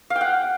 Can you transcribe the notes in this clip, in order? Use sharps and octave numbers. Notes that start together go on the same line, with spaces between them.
F5
G5
F#5